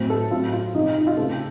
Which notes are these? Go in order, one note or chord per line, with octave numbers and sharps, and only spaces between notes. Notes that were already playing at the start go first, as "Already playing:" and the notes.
Already playing: A2 F#3 C4
A4
A2 F#3 C4 F4
F4
C3 F3 C4 D#4
D#4
D#4
F4
C#3 A3 C4 A4